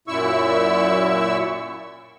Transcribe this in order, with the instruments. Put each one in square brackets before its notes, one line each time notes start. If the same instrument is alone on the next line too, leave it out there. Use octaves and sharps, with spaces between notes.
[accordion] F#2 A#2 E4 C#6 E6